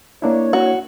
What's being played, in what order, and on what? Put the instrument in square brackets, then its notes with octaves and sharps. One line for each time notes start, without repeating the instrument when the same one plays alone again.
[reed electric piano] A#3 D4 E4 [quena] C#5
[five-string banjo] F#4